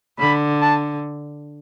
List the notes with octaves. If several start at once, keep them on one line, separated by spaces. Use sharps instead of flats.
D3 B5
A5